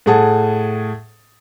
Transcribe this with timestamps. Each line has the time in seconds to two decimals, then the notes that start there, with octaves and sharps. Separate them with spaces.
0.06 A2 G#4 F#5 A5